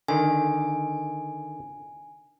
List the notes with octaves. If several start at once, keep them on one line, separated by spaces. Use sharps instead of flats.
D3 D#3 G#5